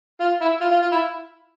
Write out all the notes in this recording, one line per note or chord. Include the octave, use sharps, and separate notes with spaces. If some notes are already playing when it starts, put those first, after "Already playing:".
F4
E4
F4
F4
F4
E4